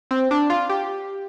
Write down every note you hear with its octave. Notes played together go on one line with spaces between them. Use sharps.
C4
D4
F4
G4